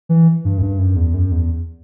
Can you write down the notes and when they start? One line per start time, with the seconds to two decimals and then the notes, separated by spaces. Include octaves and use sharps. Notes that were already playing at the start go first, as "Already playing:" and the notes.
0.09 E3
0.45 G2
0.58 F#2
0.62 G2
0.79 F#2
0.96 E2
1.14 F#2
1.32 E2